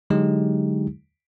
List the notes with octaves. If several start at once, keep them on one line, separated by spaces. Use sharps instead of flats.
D3 F#3 G#3 D#4 G4